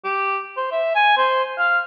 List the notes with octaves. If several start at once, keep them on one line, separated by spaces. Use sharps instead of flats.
G4
C5
E5
G#5
C5
F5